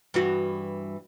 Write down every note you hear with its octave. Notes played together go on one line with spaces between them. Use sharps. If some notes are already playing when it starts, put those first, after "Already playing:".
G2 E3 F#4